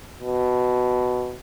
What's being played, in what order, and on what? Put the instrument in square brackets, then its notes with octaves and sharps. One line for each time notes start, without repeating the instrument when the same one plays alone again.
[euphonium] B2